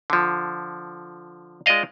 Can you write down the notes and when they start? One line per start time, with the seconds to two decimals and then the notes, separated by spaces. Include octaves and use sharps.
0.10 D3 F3
1.66 G#3 F4 D5 D#5 F5